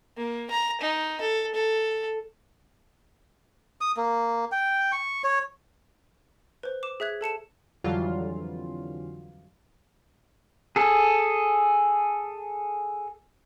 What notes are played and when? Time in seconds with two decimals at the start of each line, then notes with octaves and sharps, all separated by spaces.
0.17 A#3
0.51 A#5
0.81 D#4
1.21 A4
1.55 A4
3.81 D#6
3.97 A#3
4.52 G5
4.92 C#6
5.24 C#5
6.63 B4 C5
6.83 D6 E7
7.00 G#4 E5 F#6 G#6
7.21 A4 A5 C#7 E7
7.84 F2 D3 E3 F#3 G3 F4
10.76 G#4 A4